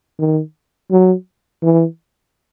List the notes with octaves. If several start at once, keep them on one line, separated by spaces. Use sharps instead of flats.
D#3
F#3
E3